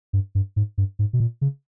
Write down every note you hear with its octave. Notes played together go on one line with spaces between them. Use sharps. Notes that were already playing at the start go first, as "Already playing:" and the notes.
G2
G2
G#2
G2
G#2
B2
A#2
C#3